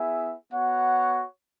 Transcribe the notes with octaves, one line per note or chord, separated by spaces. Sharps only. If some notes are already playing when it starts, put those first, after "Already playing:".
Already playing: B3 E4 G#4 E5
B3 F#4 C#5 F#5